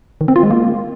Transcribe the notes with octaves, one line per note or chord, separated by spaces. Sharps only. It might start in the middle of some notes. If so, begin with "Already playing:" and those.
D#3
C4
F4
G#3
A#3